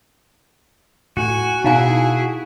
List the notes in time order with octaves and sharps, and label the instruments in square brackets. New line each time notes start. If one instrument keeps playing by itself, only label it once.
[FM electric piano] A2 [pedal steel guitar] F#4 [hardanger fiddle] G#5
[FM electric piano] B2 [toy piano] D#4 F5 G#5 [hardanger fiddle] E4 G#4